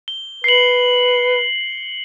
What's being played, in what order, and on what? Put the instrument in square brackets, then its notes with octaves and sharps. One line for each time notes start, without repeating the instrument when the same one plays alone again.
[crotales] G7
[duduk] B4 [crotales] C7 C#7 F#7